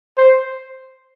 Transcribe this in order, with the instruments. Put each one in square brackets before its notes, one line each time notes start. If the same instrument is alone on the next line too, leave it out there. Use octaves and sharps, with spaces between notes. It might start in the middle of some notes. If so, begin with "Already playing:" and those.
[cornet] C5